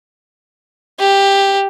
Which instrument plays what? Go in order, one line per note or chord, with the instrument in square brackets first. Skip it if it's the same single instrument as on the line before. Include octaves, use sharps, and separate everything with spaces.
[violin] G4